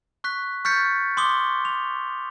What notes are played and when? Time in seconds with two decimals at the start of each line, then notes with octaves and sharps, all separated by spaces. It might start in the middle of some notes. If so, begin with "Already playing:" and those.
0.24 C#6 F#6 B6
0.65 C#6 F6 G6 A6 B6 C#7
1.17 C6 D6 D#6 G7
1.65 F7